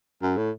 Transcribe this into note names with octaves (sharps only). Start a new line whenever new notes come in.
F#2
A2